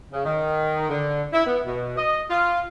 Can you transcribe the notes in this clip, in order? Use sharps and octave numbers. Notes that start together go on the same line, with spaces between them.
C#3
D#3
D3
E4
B3
B2
D#5
F4